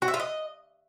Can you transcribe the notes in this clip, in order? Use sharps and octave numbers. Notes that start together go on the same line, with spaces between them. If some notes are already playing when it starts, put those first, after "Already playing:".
F#4
E5
F4
D#5